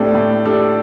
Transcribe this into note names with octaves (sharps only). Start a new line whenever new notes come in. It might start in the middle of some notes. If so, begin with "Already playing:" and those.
Already playing: A2 G3 A3 C4 D4 A4
A2
G3 D4 A4